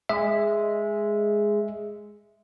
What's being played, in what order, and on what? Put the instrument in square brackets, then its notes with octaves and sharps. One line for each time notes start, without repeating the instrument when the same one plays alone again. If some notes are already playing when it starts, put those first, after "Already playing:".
[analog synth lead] G#3 [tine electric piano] E5